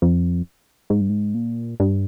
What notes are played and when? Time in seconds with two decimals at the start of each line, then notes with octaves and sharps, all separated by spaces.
0.02 F2
0.90 G#2
1.01 G2
1.10 G#2
1.35 A#2
1.80 G2